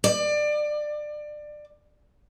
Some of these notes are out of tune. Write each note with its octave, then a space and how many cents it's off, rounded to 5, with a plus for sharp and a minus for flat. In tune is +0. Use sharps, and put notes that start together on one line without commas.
D5 +25